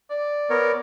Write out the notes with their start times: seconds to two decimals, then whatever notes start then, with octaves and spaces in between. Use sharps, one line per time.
0.10 D5
0.50 B3 A#4 C#5